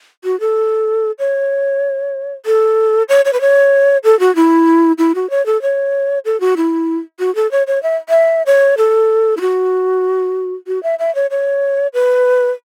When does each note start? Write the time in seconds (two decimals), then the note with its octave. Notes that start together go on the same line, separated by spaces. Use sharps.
0.24 F#4
0.40 A4
1.19 C#5
2.46 A4
3.09 C#5
3.25 C#5
3.33 B4
3.41 C#5
4.04 A4
4.20 F#4
4.36 E4
4.98 E4
5.15 F#4
5.30 C#5
5.46 A4
5.62 C#5
6.25 A4
6.40 F#4
6.57 E4
7.19 F#4
7.35 A4
7.51 C#5
7.67 C#5
7.83 E5
8.09 E5
8.46 C#5
8.78 A4
9.37 E4
9.41 F#4
10.67 F#4
10.83 E5
10.99 E5
11.15 C#5
11.31 C#5
11.94 B4